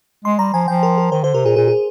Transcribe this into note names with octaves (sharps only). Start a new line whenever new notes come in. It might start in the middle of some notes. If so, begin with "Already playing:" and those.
G#3 C6
G3 A#5
F3 G#5
F3 G5
A#4
A#4
D#3 C5
D3 C5
C3 A#4
A#2 G#4
A#2 G#4
G#4